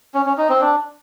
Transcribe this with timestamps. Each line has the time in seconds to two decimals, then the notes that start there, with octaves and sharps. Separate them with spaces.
0.14 C#4
0.26 C#4
0.38 D#4
0.49 C4
0.61 D4